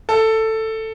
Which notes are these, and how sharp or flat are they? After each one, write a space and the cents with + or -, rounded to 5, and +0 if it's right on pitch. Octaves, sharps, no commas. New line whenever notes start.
A4 +10